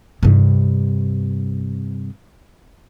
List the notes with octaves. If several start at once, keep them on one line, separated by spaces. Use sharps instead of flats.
G2 C3